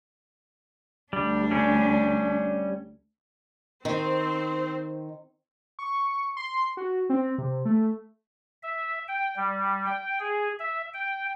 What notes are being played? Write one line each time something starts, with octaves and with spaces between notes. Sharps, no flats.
D2 G3 D4
G3 C#4
D#3 C4 C5
C#6
C6
F#4
C4
C3
A3
E5
G5
G3
G5
G#4
E5
G5